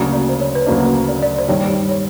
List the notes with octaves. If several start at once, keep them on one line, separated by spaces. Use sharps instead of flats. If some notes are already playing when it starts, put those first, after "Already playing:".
Already playing: D2 C#3 F#3 A#3 D4
D5
C5
C#5
B4
D2 C#3 F#3 A#3 D4 C5
D5
D5
C5
G2 D#3 G3 C#5
C#5